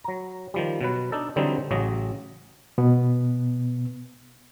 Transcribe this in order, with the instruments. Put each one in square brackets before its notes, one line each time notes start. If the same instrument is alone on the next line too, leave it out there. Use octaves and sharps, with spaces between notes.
[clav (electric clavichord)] F#3 A#5
D#3 F3 G3
B2 F#3 B4
D4 D#4 A4
D3 E3 F#3 G3 C4 D#4
A1 C#3 F#3 D#5
[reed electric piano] B2 B3